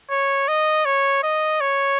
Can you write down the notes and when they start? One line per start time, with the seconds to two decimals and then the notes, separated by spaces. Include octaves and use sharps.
0.11 C#5
0.48 D#5
0.86 C#5
1.24 D#5
1.61 C#5